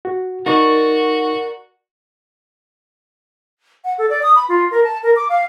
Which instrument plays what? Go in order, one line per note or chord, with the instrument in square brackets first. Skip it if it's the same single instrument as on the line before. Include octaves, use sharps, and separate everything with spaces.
[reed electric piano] F#4
[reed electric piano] D#4 [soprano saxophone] F#4 [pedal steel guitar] A#4 D5 C#6
[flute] F#5
A4
D5
D#6
B5
F4
A#4
A5
A#4
D6
F5